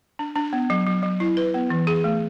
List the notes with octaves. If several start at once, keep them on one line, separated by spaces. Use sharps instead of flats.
D4
D4
B3
F#3
F#3
F#3
E4
B4
B3
E3
G#4
A3